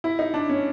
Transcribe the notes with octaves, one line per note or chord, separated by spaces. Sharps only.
E4
D#4
D4
C#4